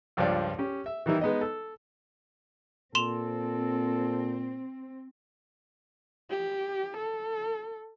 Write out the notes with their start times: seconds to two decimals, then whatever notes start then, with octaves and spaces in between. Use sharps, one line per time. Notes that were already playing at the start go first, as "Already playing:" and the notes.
0.17 C#2 G2 F3 C5 D5
0.58 C#4 G4
0.86 E5
1.06 D#3 E3 G3 D#4 E4
1.21 G#3 B3 D#4 D#5
1.41 A4
2.95 A#2 C4 A4 C6 E7 F7
6.31 G4
6.97 A4